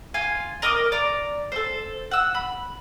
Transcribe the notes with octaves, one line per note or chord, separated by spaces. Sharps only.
F4 G#5
A#4 D#5 D6 D#6
D5 A#5
A4 C5
F#5 E6
B5